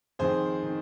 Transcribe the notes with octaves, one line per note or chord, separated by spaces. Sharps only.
F2 D#3 G#4 C5
D#3